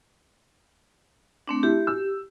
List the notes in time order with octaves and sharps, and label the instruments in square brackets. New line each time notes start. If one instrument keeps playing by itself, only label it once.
[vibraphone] A3 C4 D4
[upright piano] E4 [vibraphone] G4
[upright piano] E6